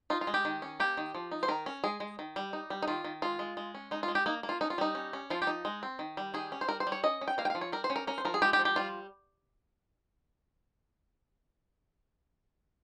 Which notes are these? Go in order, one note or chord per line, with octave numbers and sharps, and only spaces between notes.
D#4 F4
F4
G#3
G4
D#3
C#4
A#3 G4
D#3
F3
D#4
C5
D#3 A#4
C#4
G#3 G#4
G#3
D#3
G3
D#4
G3
D#4
D#3 F4
D#3
G#3 F4
G#3
G#3
C#4
G#3 D#4
F4
G#3
G4
A#3 D#4
A#3
F4
C#4 D#4
F4
G3 D#4
C#4
C#4
F3 F4
G4
D#4
G#3
C4
D#3
G3
D#3 G#4
C#4
C5
G3 A#4
C5
G3
C#5
C#4 D#5
C#4
G5
A#3 F5
G5
F5
F3
C#5
G3 A#4
C5
C#4
A#4
C#4 A#4
C5
F3 A#4
G#4
G#3 G4
G4
F3
G4
G3 F4